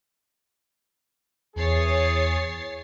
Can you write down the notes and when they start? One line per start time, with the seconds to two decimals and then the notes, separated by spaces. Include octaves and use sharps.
1.56 E2 E3 G#4 C#5 A6 C7